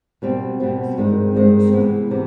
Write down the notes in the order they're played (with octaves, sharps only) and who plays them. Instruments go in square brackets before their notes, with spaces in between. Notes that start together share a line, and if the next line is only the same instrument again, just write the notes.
[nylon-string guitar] B2 G3 C4
B2 G3 C4
G2 D#3 G#3 C4 D#4
G2 D#3 G#3 C4 D#4
C3 E3 G#3 B3
C3 E3